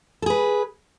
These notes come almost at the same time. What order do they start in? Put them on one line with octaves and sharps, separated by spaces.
A4 G#4 B4